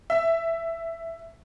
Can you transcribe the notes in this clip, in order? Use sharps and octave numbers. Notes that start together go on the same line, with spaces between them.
E5